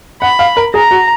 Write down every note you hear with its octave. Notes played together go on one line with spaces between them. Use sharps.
F#5 B5
F5
A#4
G#4 A#5
F#4